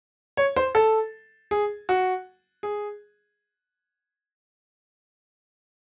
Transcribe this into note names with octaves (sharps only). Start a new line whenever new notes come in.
C#5
C5
A4
G#4
F#4
G#4